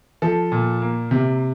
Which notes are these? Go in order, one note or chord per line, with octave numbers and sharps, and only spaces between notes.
F3 A4
A#2
A#3
C3